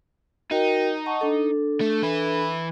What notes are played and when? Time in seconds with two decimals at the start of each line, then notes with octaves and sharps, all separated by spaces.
0.51 D#4 F#4 A#4 G5
1.06 F#5 A5 C#6
1.21 D4 A4
1.81 A3
2.03 E3 B4